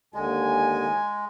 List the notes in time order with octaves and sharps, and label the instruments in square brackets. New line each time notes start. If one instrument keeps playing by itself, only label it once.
[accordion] D#2 D3 [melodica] G#3 [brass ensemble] G#5